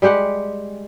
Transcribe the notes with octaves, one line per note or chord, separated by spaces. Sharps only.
G3 G#3 G4 F#5